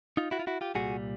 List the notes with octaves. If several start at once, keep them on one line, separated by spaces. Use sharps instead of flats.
D#4 F4
E4 F#4
F4
E4 F#4
F4 G4
C2 A#2 G3 F#4 G#4